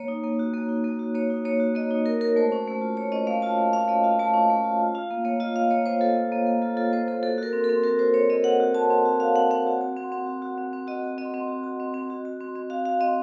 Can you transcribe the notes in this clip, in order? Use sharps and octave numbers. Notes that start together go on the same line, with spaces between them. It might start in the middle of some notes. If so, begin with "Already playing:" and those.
Already playing: A#3 C#5
D#4
A#3
F#4
A#3
D#4
A#3
F#4
A#3 C#5
D#4
A#3 C#5
F#4
A#3 D#5
D#4 C#5
A#3 A#4
F#4 A#4
A3 C5
C#4
A3
F4
A3 C#5
C#4 D#5
A3 F5
F4 A5
A3
C#4 F5
A3 D#5
F4 F5
A3 A5
C#4
A3
F4
F4
F4 F5
A#3
A#3 C#5
F4 D#5
F4 F5
A#3 C#5
A#3 C5
F4 A4
F4
A#3
A#3
F4 A4
F4 A4
A#3 C5
A#3 A4
F#4 A4
F#4 A#4
C4
A4
C4
F#4 A#4
F#4 C5
C4 C#5
C4 D#5
F#4 F#5
F#4
C4 A5
C4
F#4
F#4 F5
C4 F#5
C4 F#5
F#4
F#4
C4
C4
F#4
F#4
C4
C4
F#4 D#5
F#4
C4 D#5
C4
F#4
F#4
C4
C4
F#4
F#4
C4
C4
F#4 F5
F#4 F5
C4 D#5